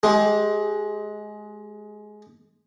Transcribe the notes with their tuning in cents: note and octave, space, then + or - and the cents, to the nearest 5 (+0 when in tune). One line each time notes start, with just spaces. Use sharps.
G#3 +20 G4 +0